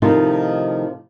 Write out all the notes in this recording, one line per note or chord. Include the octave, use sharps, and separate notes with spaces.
A2 C3 D#3 F3 D#4 F4